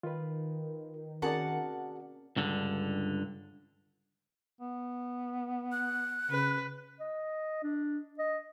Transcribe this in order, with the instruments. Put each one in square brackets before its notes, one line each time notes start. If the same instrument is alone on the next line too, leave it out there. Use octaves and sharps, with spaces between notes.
[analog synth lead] D#3 [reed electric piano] F4 B4
[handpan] C4 C#4 A#4 [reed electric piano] F#4 G#4 D5 [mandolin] F#5 A5
[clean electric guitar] C#2 G2 D3
[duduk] B3
[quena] F#6
[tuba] C#3 [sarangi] B4
[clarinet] D#5
D4
D#5